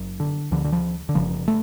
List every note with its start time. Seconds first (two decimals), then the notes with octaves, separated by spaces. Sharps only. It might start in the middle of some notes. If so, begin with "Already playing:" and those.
Already playing: F#1 F#2
0.20 D3
0.51 D2 D3 F3
0.64 D3
0.72 F3
1.09 D3
1.15 F#1 F#2 C#3 F3
1.48 A3